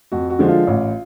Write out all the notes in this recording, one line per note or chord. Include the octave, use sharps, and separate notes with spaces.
F2 F#4
F#4
D3 F3 G#3
F4
A1